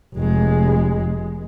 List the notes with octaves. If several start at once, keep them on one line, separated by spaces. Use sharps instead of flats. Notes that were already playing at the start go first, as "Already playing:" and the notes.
F1 G#3